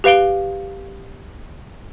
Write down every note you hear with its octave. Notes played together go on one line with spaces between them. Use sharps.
G4 B4 F5 D7 G7